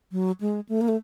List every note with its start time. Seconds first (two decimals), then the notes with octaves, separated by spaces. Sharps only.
0.12 F#3
0.41 G#3
0.69 A3
0.81 A#3
0.88 A3